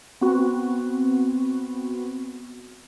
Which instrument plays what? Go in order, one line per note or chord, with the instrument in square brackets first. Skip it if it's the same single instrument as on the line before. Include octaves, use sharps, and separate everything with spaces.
[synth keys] B3 C4 F#4